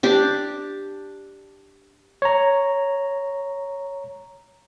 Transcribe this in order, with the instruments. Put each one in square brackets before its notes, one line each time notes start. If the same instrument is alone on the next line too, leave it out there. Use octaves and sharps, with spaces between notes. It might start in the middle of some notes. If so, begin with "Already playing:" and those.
[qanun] D4 G4 D6
[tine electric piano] C#5 A#5